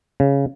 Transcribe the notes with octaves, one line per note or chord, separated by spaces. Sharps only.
C#3